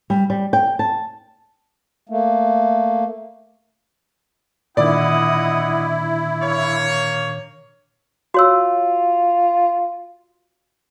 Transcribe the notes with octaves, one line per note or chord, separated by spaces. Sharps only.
G3
G3
G5
A5
A3 A#3
A#2 D#3 D4 E4 D5 D#5 F#5 D#6
A#3 C#5
F4 F#4 C#5 E6